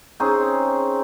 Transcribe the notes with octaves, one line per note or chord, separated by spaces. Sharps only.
C4 C#4 D#4 G#4